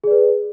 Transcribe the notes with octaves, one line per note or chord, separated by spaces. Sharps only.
G#4 B4 D5